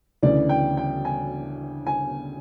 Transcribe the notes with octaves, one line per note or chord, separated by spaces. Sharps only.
D2 C#3 E3 D5
G5
G5
G#5
G#5